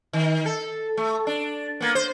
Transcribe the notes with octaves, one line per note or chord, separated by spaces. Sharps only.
D#3
A4
A3
D4
A#3 B3
C5